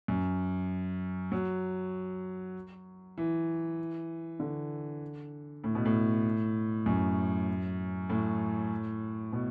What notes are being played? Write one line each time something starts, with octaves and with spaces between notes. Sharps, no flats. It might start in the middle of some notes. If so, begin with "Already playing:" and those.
F#2
F#3
E3
D3
A2
B2
A2
F#2
A2
B2